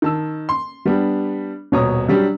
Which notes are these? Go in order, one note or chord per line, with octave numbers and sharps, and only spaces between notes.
D#3 A5 E6
C6
G3 B3 D4 G4
D#1 B2 C#5 A#5 D#6
F#3 G3 D4 G4